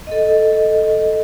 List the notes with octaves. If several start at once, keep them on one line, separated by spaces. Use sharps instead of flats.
A4 D#5